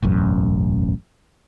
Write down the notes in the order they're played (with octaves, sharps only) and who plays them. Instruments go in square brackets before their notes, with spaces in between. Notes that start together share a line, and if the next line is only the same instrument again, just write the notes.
[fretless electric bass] E1 A1 F#2